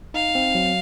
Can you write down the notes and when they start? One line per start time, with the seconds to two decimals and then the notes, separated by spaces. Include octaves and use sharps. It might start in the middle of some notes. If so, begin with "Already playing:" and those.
0.14 D#4 F5
0.35 C4
0.55 F#3